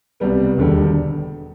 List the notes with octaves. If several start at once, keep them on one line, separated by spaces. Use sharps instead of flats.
C2 B2 G3 B3
E1 D#2 D3 G3